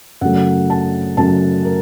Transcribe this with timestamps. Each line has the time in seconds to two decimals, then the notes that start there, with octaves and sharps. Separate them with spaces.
0.21 F#2 C#3 F#3 A3 F#5
0.70 A5
1.17 F#2 C#3 F#3 A3 A5
1.65 A#4